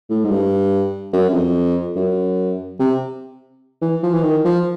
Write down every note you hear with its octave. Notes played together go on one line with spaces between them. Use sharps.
A2
G#2
G2
F#2
F#2
F2
F#2
C3
E3
F3
E3
D#3
F3